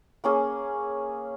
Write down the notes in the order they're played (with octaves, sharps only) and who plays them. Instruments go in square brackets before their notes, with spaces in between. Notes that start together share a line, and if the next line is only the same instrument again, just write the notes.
[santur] A#3 C#4 G#4